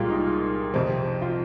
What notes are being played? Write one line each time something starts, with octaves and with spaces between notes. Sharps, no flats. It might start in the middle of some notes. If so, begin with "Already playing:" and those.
Already playing: C2 A#2 G#3 F4 G4
D#4
F2 C3 F3 C4
F4